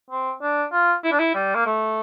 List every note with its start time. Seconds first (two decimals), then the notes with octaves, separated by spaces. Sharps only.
0.10 C4
0.42 D4
0.72 F4
1.04 E4
1.12 D4
1.19 E4
1.35 G3
1.55 A#3
1.66 A3